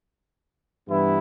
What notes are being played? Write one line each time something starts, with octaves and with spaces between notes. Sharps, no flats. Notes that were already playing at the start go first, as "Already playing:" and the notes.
G2 E3 G3 B3 E4